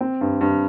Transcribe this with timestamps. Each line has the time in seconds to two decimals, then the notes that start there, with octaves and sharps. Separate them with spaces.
0.01 C4
0.21 G2
0.41 G2